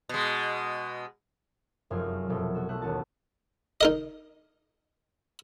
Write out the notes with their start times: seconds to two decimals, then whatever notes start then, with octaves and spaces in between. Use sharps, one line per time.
0.09 B2 G#3
1.90 F1 F#2 F3 G#3 G#5 F6
2.29 F1 B2 A4
2.55 F#4 A4
2.69 B1 A3 F#6
2.82 E1 D#2 B3 C#4 F#4 A5
3.81 D#4 A#4 D#5